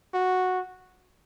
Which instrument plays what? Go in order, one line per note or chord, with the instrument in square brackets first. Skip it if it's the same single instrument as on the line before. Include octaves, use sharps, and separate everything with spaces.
[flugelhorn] F#4